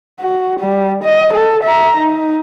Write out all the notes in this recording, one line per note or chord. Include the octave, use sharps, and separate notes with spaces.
F#4
G3
D#5
A4
E5 A#5
D#4